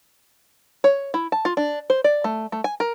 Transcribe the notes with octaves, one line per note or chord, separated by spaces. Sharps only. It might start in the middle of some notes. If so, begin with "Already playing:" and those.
C#5
E4
A5
F4
D4
C5
D5
A3
A3
G#5
A#4